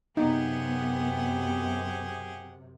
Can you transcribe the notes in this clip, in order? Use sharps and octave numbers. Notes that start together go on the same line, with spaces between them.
F#2 C3 B3 D#4 G4 G#4 F#5